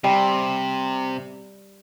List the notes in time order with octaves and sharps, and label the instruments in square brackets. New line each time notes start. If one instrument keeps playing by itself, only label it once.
[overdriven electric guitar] C3 [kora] G3